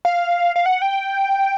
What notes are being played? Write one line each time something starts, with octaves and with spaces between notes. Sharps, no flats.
F5
F5
F#5
G5